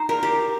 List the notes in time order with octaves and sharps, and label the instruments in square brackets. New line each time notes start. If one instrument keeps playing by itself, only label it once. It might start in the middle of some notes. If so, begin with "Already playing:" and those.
Already playing: [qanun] D#4 C5
A#4
G4